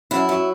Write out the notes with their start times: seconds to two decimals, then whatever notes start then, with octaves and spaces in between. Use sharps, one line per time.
0.11 F#2 E4
0.29 F#3